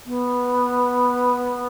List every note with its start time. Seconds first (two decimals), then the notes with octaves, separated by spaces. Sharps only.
0.06 B3